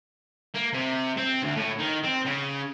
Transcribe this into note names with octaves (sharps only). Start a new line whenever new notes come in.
A#3
C3
C4
D2
A2
D#3
C4
C#3